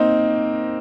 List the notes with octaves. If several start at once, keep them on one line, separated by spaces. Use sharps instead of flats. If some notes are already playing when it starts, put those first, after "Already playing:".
Already playing: A#3 C4 D#4